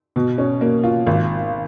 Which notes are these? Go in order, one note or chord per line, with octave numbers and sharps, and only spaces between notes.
B2
C#4
A#3
F4
G#1